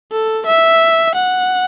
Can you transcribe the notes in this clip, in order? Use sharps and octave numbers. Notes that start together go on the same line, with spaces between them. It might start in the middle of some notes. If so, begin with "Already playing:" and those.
A4
E5
F#5